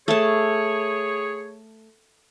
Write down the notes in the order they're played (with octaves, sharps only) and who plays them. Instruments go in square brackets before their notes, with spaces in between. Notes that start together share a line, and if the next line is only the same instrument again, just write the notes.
[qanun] A3 A5 [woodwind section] G#4 C#5